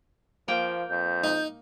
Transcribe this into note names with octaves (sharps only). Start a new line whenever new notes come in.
F3 A#3 G5
F2 G6
D#4